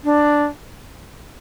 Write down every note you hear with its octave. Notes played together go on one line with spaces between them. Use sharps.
D4